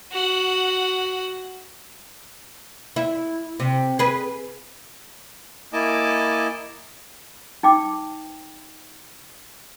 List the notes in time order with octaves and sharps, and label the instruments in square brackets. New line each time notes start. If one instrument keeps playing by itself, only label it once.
[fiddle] F#4 F#5
[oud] E4
C3
G#4 B4
[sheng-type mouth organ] A#3 E4 D#5 G#5 A5 D6
[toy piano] D#4 G5 D6